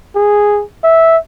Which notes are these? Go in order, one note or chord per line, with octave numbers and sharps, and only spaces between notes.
G#4
E5